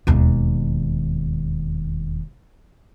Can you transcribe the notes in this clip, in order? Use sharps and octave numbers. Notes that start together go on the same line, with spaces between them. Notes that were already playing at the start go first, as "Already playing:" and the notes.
E1 D#2